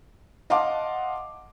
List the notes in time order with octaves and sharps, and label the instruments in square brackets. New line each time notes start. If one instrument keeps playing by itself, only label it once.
[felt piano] D#5 F5 F#5 A5 C6 D6